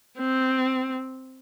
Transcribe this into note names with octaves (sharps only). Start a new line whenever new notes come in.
C4